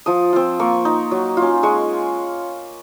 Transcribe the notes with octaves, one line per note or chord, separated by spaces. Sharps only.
F3 D#6
C4 F4
A#3 C#6
D#4
F#3
C#4 F4
G#3 C#6